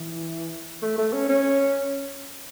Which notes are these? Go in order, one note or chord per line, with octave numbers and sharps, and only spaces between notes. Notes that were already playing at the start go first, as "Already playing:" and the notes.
Already playing: E3
A3
A3
C#4
C#4